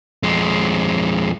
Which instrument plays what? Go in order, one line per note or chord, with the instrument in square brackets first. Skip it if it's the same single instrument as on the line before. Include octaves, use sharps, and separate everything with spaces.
[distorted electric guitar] F2 G#3